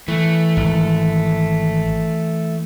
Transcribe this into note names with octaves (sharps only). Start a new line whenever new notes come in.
E3 A3
G#1